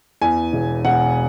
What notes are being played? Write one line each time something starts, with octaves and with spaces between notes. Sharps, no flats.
E2 G#5
E1
E1 F#5